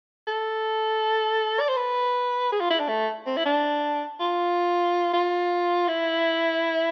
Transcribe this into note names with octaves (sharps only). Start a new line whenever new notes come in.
A4
D5
C5
B4
G#4
F4
E4
D4
A3
C4
E4
D4
F4
F4
E4